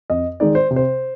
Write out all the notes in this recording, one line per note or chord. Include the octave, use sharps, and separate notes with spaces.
F2 D#5
D#3 G#3 D#4 D5
C5
C3
C5